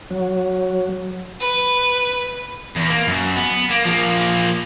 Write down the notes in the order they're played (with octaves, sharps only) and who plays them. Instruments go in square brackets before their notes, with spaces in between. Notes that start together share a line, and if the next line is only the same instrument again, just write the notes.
[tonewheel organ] F#3
[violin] B4
[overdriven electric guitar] E2
A#3
F#2
B3
A#3
F3 A#3